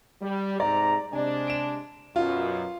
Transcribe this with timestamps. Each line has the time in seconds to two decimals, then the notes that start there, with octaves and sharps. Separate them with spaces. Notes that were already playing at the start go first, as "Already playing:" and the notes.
0.21 G3
0.60 G#2 C3 D5 A#5
1.13 C3 G#3 D4 G#5
1.47 D7 E7
2.16 F#2 B2 F4